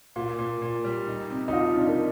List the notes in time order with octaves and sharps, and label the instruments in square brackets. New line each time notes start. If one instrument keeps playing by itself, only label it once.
[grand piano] A#2 [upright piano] F4
[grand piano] A#2
A#2
G3
D#4
C3
[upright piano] D#4
[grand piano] F3 [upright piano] F4
[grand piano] C3 [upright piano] D4
[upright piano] A#3